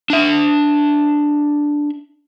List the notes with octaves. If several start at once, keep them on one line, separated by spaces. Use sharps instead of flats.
D4 E5